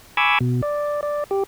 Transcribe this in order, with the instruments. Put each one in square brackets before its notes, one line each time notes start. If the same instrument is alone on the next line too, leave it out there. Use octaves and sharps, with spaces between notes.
[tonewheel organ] G#5 B5 C#6 D6 E6 G#6
B2
D5
D5
G4